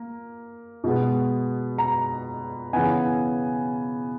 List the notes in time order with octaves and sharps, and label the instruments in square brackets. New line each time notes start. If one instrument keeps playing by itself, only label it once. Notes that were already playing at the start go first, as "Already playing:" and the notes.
Already playing: [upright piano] A#3
B2 G#3 B3
A#5
C#3 E3 B3 G#5